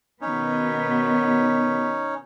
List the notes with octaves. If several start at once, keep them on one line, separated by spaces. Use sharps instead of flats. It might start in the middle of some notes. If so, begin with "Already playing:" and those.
B2 D#3 B3 C#4 D#4 C#5